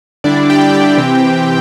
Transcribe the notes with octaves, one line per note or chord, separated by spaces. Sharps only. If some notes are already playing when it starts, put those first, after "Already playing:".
D3 G3 D4 E4 D5
G4 G5
G4 G5
C3 E3 C4